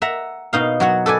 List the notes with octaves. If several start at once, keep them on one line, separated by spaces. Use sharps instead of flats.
E5 F#5 A#5
B2 D#4 F5
F#3 F#4 F#5
A4 B4 D5 G#5